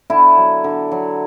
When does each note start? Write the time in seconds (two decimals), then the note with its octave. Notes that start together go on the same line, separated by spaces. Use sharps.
0.10 D3 E4
0.37 F#3
0.64 D3
0.91 F#3